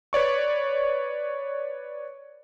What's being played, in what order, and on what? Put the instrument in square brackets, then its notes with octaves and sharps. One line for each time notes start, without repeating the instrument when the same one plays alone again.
[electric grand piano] B4 C#5 D5 C#6